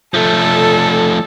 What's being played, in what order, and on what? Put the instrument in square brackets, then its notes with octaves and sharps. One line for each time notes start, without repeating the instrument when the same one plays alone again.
[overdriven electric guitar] F3 A3 [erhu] A4